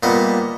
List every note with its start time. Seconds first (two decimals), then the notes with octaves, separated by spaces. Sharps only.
0.03 A#2 G3 B3 D#5